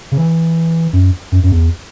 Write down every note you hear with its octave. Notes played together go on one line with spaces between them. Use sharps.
C#3
E3
F#2
F#2
F#2
E2